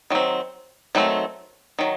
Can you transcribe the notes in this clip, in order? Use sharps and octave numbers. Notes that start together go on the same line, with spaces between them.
D#3 F#3 C4
D#3 F#3 A3 C4
D#3 F#3